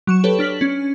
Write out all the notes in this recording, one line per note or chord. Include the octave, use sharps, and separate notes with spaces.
F#3 C#6 E7
G4 A4 B4 C#5
D4 F6 B6 F#7
C#4